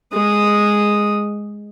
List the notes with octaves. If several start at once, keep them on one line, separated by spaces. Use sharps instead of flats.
G#3 D#6